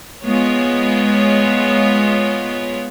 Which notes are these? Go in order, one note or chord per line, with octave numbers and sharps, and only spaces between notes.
G#3 B3 F4 C#5